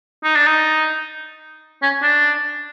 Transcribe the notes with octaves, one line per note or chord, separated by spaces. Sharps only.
D#4
D4
D#4
C#4
D4